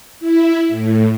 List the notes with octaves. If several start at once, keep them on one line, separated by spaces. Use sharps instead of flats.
E4
A2